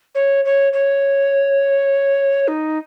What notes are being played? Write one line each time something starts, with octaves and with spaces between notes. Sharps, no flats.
C#5
C#5
C#5
D#4